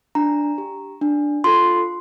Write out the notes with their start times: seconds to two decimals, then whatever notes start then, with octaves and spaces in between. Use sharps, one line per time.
0.15 D4 A#5
0.58 G4
1.01 D4
1.44 F4 A4 C6